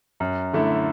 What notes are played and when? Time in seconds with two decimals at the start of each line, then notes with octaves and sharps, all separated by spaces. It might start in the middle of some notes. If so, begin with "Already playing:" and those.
0.20 F#2
0.53 D3 A3 E4